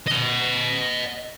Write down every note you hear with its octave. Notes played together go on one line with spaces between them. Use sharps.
D#5 F#5